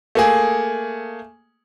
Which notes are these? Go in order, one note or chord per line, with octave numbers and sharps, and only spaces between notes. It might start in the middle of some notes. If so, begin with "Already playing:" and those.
A3 A#3 G#4